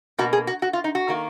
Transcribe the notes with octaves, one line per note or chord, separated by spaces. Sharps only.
B2 A#3 F#4
G#4
F#4
F#4
F4
D#4
F#4
D#3 A#3